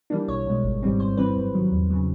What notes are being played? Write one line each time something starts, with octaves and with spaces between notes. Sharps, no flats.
E3 G3 A#3 D4
B1 C#5
B2 G#3
G#1
G#2 E3 G3 C4
G2 C5
E3 G3 C4 B4
F#2
D#3 F#3
E2
C#3 F#3